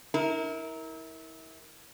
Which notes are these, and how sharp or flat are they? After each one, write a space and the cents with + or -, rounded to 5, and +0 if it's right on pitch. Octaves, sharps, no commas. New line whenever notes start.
E4 -30 A#4 +0